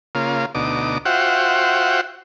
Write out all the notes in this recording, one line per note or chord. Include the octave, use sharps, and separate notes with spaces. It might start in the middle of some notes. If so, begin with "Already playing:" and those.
C#3 A#3 F4
D2 B2 D#4 D6
F4 F#4 C5 E5 F#5 G5